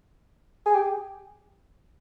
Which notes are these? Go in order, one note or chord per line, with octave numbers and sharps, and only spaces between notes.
G#4
G4